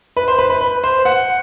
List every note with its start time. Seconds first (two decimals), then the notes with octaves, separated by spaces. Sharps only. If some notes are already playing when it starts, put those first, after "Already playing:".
0.17 B4
0.28 C5
0.38 B4
0.50 B4
0.61 B4
0.84 C5
1.05 F#5